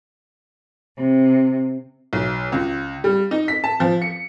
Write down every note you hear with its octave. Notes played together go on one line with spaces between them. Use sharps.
C3
B1
C#2
G3
D#4
B6
A5
F3
C#7